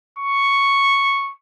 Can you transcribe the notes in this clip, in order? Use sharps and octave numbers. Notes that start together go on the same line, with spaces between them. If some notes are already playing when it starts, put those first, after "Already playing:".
C#6